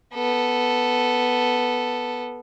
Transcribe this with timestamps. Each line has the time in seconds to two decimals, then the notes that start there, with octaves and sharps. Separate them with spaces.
0.14 B3 A4